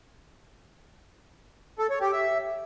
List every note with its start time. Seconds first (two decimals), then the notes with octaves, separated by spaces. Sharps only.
1.79 A4
1.90 C#5
2.01 G4
2.12 E5